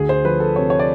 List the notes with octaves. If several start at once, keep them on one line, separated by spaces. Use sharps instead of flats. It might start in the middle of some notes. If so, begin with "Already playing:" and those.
Already playing: D2 G#4
C5
F3 B4
A4
C3 C#5
C#5
D5